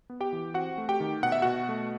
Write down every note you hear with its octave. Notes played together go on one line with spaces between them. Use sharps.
B3
G4 G5
E3
C4 F#4 F#5
A3
G4 G5
D#3
B2 F#5
E5
B2 F#4 F#5
A3